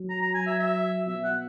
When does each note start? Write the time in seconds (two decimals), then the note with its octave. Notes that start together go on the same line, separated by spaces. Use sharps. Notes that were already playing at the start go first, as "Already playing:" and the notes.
Already playing: F#3
0.10 A#5
0.22 A#5
0.34 G#5
0.46 E5
0.59 E5
1.08 B2 E5
1.24 F#5